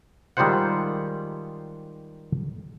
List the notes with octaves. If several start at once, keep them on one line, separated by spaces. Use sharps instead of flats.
D#3 G3 G#3 F4 C5 F#5